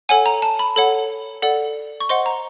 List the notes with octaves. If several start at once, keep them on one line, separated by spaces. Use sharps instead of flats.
A4 C#5 F#5 G#5
A#5
A5
B5
A4 C#5 F#5
A4 D5 F#5
C#6
C5 D#5 F#5 C6
A#5